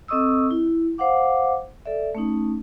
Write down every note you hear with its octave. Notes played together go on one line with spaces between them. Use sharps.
C4 A4 D#5 C#6 D#6 E6
E4
C5 F5 F#5 D6
A4 D5 E5
A3 C#4 D#4